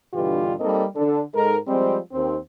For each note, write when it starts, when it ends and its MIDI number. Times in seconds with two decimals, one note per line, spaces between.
0.14 0.53 43
0.14 0.53 47
0.14 0.53 50
0.14 0.53 52
0.14 0.53 65
0.14 0.53 67
0.59 0.84 55
0.59 0.84 58
0.59 0.84 60
0.59 0.84 63
0.59 0.84 69
0.59 0.84 75
0.96 1.20 50
0.96 1.20 69
1.33 1.56 44
1.33 1.56 56
1.33 1.56 63
1.33 1.56 69
1.33 1.56 70
1.67 1.98 53
1.67 1.98 55
1.67 1.98 56
1.67 1.98 60
2.12 2.36 39
2.12 2.36 60